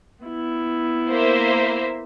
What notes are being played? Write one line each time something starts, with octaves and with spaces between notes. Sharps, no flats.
B3 E4
A#3 C5 E5